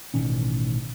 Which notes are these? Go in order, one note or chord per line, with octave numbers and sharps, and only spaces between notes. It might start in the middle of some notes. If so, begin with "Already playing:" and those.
A1 B2 D#3 C#4